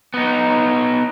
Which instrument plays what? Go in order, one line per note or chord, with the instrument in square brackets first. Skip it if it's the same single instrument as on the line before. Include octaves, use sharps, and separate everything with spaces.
[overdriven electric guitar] B3 D#4